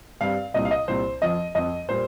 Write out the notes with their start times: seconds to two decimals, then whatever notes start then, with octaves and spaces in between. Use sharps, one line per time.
0.21 G2 G3 C4 F5
0.54 C2 A#2 G3 C4 D#5
0.65 F5
0.71 D#5
0.88 C2 A#2 G3 C4 C5
1.21 F2 F3 C4 D#5
1.55 F2 F3 C4 D#5
1.89 A#2 G3 A#3 C5